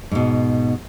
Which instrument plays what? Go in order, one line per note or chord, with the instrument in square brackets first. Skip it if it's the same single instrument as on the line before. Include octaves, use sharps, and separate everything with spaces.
[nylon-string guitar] G#2 B2